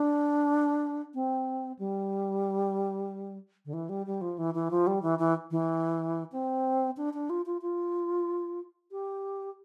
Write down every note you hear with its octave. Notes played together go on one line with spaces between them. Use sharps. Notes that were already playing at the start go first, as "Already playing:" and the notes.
Already playing: D4
C4
G3
D3
E3
G3
G3
F3
E3
E3
F3
G3
E3
E3
E3
C4
D4
D4
F4
F4
F4
G4